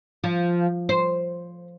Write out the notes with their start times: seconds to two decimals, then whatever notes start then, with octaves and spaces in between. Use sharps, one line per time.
0.24 F3
0.89 C5